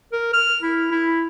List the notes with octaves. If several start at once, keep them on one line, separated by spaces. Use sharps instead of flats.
A#4
F6
E4
E4